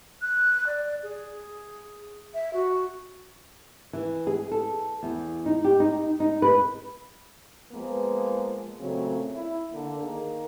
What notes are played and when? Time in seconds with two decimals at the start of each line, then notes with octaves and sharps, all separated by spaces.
0.22 F#6
0.66 D5
1.03 G#4
2.34 E5
2.53 F#4
3.93 E3
4.27 G#4
4.51 A4
5.03 E2
5.46 D#4
5.64 G4
5.80 D#4
6.20 D#4
6.42 B4
7.72 F3 G#3 A#3 B3
8.81 A#2 C#3 F#3 A3 C4
9.33 E4
9.72 D3 A#3
10.01 D#3 A#3 G#4 A#4